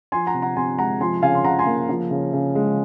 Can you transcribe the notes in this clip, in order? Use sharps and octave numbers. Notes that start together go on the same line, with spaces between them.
F3 G#5 C6
F#5 A#5
C3
F#5 A#5
C3 G#5 C6
G#3 F#5 A#5
F3 G#5 C6
C#3 F5 G#5
C6
C#3 F#5 A#5
G#5 C6
A#3
F3
C#3
C#3
G#3